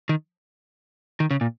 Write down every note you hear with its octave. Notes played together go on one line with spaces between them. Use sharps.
D#3
D#3
C#3
A#2